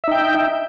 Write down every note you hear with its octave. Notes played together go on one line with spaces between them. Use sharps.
D#4 E5 G5